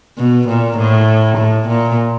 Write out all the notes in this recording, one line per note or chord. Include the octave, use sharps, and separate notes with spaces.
B2
A#2
A2
A2
A#2